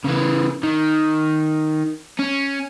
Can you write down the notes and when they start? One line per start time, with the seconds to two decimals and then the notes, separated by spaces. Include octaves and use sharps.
0.05 C#3 E3
0.63 D#3
2.19 C#4